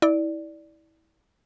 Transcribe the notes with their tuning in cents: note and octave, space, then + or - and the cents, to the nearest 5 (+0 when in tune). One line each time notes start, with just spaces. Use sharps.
E4 -30 D5 +0